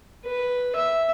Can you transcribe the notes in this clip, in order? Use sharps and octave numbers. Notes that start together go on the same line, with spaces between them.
B4
E5